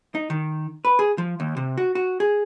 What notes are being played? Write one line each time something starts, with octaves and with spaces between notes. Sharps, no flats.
D#4
D#3
B4
G#4
F3
D#2
C3
F#4
F#4
G#4